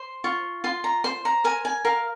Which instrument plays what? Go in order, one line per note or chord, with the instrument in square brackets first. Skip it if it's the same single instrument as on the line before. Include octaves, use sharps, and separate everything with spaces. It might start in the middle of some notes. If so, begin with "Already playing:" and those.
Already playing: [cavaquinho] C5 C6
F4 C#6
F4 C6
A#5
C5 C6
A#5
A#4 G#5
G#5
A#4 F5